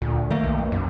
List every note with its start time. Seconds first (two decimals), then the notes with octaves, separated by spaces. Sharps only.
0.02 D2 A#2
0.30 D#3 A3 A#3
0.43 B1
0.58 F#2
0.72 B1 F#2